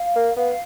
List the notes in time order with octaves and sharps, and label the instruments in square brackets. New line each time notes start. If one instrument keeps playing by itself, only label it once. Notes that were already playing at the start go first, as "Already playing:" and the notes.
Already playing: [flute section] F5
[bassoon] A#3
[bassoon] B3 [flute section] F5